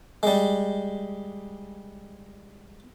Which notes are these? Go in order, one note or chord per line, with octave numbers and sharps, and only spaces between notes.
G3 G#3